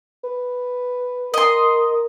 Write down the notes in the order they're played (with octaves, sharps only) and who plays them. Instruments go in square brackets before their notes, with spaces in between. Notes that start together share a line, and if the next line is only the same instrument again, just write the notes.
[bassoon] B4
[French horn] A#4 [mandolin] D#5 C6